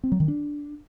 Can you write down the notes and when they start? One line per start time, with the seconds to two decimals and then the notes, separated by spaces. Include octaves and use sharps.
0.04 C4
0.12 F#3
0.20 D#3
0.28 D4